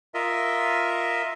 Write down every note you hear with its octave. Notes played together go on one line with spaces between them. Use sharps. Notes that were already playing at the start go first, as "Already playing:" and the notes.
F4 A#4 D#5 E5